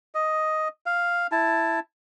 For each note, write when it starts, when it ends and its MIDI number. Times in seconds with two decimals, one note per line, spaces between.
0.15 0.68 75
0.86 1.27 77
1.32 1.79 64
1.32 1.79 81